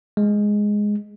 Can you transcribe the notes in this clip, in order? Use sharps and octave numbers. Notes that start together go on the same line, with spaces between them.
G#3